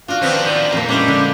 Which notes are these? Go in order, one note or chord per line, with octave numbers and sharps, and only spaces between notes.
D4 F4 F#4 F5
D#2 F3 B3 C4
D#4 F4 D5
F2 A#2 A#3 D4 A#5
G3 G#3 C#4 D4 E4 D6
D3